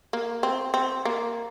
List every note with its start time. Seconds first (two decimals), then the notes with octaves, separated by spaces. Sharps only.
0.13 A#3
0.43 C4
0.74 C4
1.05 A#3